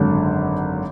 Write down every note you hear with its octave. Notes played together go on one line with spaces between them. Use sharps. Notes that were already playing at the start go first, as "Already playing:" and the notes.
Already playing: G#1 F#2 D3 F#3 A4 C#5